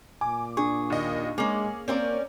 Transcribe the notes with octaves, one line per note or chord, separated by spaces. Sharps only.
A#2 G#5 D6
D4 G#4 C#6
D#2 D#5
G#3 A#3 C#4 G#4
A#3 C4 C#4 A#4 D5